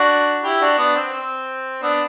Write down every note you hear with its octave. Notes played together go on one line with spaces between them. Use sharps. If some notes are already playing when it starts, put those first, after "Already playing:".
Already playing: D4 F#4
E4 G4
D4 F#4
B3 D4
C4
C4
B3 D4